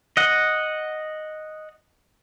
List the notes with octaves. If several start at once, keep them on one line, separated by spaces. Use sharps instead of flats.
D#5 F#5